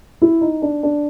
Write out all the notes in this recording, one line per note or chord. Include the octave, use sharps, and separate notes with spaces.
E4
D#4
D4
D4